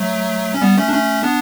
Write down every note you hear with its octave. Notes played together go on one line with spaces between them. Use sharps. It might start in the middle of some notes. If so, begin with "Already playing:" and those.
Already playing: F#3 A3
C#4
G3 B3
A3 C#4
D4
A3 C#4
B3 D4